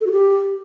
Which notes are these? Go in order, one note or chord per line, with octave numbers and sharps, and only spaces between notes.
A4
F#4
G4